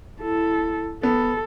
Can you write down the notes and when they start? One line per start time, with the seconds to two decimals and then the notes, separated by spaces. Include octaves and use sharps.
0.21 E4 A4
1.03 B3 A4